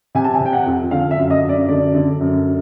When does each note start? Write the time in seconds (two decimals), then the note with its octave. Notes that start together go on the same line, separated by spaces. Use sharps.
0.15 C3 G#5
0.24 A5
0.34 G#5
0.40 C3
0.45 G5
0.53 F#5
0.66 F2
0.91 D3 F5
1.11 E5
1.17 F#2
1.30 D#5
1.44 F#2
1.49 D5
1.68 D3 D5
1.94 D3
2.20 F#2